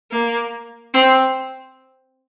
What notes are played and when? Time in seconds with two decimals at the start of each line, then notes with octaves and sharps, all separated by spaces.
0.11 A#3
0.94 C4